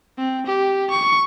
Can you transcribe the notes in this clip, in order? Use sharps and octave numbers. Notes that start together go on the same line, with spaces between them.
C4
G4
C#6